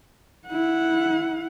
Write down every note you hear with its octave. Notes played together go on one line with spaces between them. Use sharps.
E4 F#5